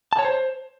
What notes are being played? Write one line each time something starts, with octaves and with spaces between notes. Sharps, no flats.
A5
C#5
C5